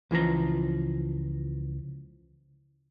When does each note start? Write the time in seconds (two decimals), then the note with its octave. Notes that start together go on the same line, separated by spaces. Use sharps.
0.11 C#2 E3 F3 A#5